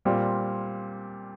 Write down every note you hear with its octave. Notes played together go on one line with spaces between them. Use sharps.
A#2 G3 C4 F4